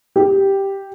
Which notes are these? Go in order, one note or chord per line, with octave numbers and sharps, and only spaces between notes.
G4